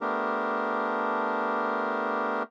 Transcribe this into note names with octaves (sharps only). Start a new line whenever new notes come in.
A3 B3 D4 G4 A#4